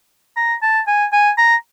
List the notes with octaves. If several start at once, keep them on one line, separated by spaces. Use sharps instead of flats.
A#5
A5
G#5
G#5
A#5